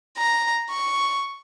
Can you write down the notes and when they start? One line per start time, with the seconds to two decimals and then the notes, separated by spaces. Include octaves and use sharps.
0.18 A#5
0.70 C#6